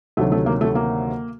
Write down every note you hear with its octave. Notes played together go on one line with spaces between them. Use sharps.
D2 C3 D#3 F#3 A3
A3
A#3
A3
A#3